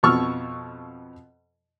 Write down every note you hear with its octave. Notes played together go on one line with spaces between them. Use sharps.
F2 B2 F3 C#6 E6 F6